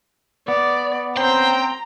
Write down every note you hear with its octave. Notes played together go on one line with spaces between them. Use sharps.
B3 D5
C4 C#4 C5 G5 A#5